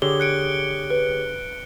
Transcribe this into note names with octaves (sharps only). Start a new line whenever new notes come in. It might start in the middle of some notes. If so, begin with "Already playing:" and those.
D3 G4 G#4 C#5 G7
F#6 C#7 D7
B4